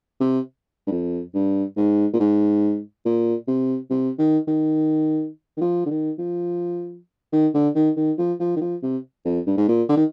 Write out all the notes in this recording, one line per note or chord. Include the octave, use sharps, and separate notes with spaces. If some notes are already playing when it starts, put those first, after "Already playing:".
C3
G2
F2
G2
G#2
A#2
G#2
A#2
C3
C3
D#3
D#3
D#3
F3
D3
D#3
F3
D#3
D3
D#3
D#3
F3
F3
D#3
F3
C3
F2
G2
G#2
A#2
D3
D#3